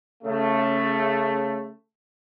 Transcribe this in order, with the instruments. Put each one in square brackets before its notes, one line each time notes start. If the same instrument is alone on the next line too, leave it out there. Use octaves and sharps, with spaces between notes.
[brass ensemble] C#3 A3